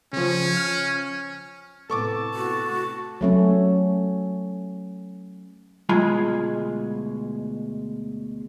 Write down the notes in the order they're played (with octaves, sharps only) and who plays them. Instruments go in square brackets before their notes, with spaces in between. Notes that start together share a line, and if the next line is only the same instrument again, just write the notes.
[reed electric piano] C#3 F3 [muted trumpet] C#4
[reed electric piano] F6
[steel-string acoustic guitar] A2 C3 B3 [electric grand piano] A4 C#6 D6 [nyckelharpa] A5
[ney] F#4
[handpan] F#3 A3 C#4
[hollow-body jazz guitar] D2 B2 G#3 F4 G#5 B5